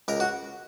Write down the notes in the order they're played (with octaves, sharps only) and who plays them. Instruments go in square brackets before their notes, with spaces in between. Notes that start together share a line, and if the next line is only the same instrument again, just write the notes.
[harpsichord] C#2 A#4
F#4